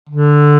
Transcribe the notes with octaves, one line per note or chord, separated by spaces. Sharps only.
D3